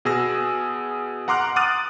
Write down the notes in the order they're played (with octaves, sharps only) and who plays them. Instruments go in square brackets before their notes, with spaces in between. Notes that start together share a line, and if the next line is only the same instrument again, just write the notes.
[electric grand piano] B2 G#4 E6 A#6
F#5 A#5 C6 D6 F6 F#6
D6 D#6 F6 F#6 A6 D#7